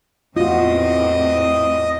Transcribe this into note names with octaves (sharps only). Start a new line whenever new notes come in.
E2 A2 C4 F4 F#4 D#5 D#6